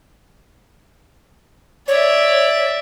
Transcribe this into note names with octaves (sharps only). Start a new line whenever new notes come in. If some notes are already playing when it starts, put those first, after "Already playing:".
C#5 D5 E5